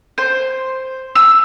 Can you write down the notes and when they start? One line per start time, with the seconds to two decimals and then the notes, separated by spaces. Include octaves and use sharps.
0.18 C5
1.15 E6